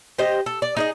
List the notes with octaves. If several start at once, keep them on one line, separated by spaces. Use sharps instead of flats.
G4 C5 D#5
A4
D5
D#4 G#4 D#5